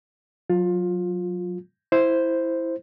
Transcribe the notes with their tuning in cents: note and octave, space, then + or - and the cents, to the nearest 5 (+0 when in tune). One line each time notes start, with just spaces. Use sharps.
F#3 -25 F4 +20
E4 +0 C5 +0